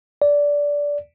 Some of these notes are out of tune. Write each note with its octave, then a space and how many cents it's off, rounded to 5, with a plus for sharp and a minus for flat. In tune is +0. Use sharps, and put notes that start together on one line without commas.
D5 -15